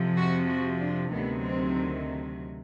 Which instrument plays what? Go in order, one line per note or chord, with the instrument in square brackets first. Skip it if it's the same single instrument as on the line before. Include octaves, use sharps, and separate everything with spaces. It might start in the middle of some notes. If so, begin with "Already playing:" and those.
Already playing: [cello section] F2 C3 F3
F#4
F#4
D4
D2 C3 D#3 F#3 B3
C4